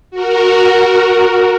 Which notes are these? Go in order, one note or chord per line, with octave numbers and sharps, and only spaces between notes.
F#4 A#4